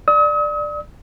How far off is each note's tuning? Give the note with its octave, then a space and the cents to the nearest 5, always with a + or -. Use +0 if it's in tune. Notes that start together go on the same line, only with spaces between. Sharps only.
D5 +15 D#6 +45